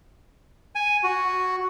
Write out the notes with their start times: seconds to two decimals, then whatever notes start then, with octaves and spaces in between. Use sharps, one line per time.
0.75 G#5
1.03 F#4